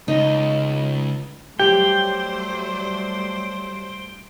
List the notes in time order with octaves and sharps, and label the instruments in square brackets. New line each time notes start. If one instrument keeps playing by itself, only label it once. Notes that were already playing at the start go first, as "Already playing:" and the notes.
[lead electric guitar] C#2 [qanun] D#4
[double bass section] F#3 G3 A3 [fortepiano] G4 [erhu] C5 [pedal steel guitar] G5